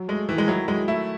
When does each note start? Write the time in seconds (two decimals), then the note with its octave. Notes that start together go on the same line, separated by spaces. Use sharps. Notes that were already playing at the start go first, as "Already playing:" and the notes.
Already playing: F#3
0.08 G#3 A3
0.29 D#3 E3
0.38 G#3
0.48 F#3 E4
0.68 F#3 G#3
0.88 A3 E4